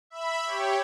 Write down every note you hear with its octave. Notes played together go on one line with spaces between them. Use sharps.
E5 B5
G4 C#5